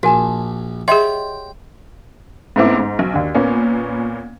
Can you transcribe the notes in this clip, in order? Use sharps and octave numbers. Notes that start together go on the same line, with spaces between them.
A#1 F#4 A#4 G#5 A5
G4 G#4 C#5 D#5 E5 F#5 G5 C6
G#2 A3 B3 C4 E4 D6
G#2
B1
D#2 D4
A#2 A#3 B3 C#4